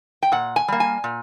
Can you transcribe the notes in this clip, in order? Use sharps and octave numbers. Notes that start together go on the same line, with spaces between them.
G5
A#2 F#5
G#5
G3 A#3
G#5
A#2